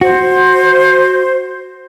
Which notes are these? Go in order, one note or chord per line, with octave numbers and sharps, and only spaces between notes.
F#4 C5